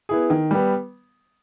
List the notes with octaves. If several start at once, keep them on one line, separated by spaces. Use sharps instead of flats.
B3 E4 G#4
D#3
G3 B3